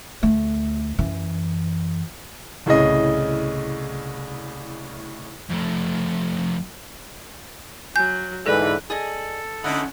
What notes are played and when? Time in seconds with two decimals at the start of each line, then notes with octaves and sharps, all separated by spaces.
0.23 D2 A3
0.99 F#2 E3
2.66 C2 A2 C#3 D#5
5.49 F2 A3
7.96 F#3 G#5 G6
8.46 G#2 D3 E3 G#4 A4 B4 D5
8.90 G#4 A4 D5 D#5
9.64 D3 A3 C#4 D#4 E4 D5 F#5